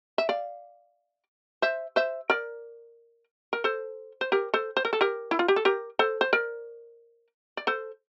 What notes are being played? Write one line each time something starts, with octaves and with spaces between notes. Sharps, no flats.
E5
D5 F5
C5 E5
C5 E5
A#4 D5
A#4
A4 C5
C5
G4 A#4
A4 C5
C5
A#4
A4
G4 A#4
E4
F4
G4
A4
G4 A#4
A4 C5
C5
A#4 D5
D5
A4 C5